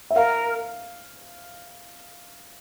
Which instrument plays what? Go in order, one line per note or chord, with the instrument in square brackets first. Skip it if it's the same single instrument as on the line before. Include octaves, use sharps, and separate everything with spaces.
[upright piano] E5
[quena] A#4 [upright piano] F5